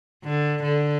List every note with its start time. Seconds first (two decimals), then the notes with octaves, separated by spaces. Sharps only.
0.24 D3
0.62 D3